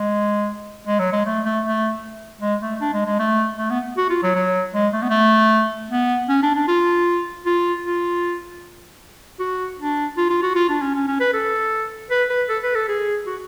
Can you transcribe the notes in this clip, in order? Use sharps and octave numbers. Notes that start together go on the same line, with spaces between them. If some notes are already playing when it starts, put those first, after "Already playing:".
Already playing: G#3
G#3
F#3
G#3
A3
A3
A3
G#3
A3
D4
G#3
G#3
A3
A3
B3
F#4
F4
F#3
F#3
G#3
A3
B3
A3
B3
C#4
D4
D4
F4
F4
F4
F#4
D4
F4
F4
F#4
F4
D4
C#4
C#4
C#4
B4
A4
B4
B4
A4
B4
A4
G#4
F#4